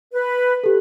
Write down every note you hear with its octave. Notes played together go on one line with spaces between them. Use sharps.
B4
G4 A4